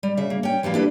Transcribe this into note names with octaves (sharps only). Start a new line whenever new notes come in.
G3
C#3 E5
A#3
C#4 G5
E3 F3 G3 A#3
D4 E4 G4 A4 B4